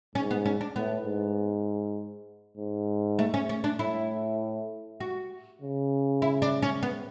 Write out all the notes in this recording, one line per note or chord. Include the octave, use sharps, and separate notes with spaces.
G#2 C#4
B3
C#4
D4
A2 B3
G#2
G#2
A3
C#4
C#4
D4
A2 E4
F#4
C#3
E4
D4
C#4
B3